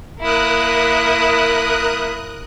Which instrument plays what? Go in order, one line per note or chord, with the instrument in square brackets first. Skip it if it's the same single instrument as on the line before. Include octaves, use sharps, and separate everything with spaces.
[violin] A#3 E4 [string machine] A#4 D#6 F#6